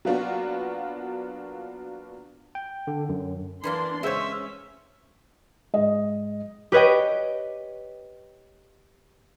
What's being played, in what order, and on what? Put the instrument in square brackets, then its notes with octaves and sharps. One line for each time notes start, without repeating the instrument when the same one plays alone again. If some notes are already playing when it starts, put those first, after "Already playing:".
[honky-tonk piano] F#3 A#3 B3 D4 F4 F#4
[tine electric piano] G5
D3
F#2
[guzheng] E3 A#3 F4 [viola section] D4 C6
[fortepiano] C#3 C5 E6 [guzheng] G#3 C#5 [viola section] C#4 [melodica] E5
[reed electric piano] G#2 G#3 [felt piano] D#5
[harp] G4 B4 C#5 D#5 G5